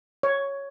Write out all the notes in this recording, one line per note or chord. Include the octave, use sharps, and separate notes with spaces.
C#5